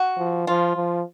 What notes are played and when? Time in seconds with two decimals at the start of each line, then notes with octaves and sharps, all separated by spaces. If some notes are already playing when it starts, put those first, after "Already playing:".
Already playing: F#4
0.17 F3
0.47 F3 F4
0.76 F3